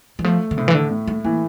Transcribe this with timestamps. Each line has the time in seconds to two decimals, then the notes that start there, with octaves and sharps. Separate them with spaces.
0.19 E3
0.24 F3 A3
0.51 D3
0.58 A2 C3
0.68 E3
0.74 D3
0.91 A2
1.07 A3
1.24 E3 A#3